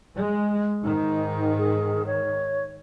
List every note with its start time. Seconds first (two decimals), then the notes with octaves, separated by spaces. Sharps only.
0.14 G#3
0.83 G#2 D#3 D#4
1.58 G#4
2.07 C#5